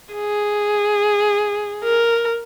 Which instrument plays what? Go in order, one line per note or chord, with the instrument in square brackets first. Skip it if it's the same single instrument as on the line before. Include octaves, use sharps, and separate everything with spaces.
[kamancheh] G#4
A#4